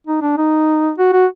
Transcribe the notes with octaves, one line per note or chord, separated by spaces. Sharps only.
D#4
D4
D#4
F#4
F#4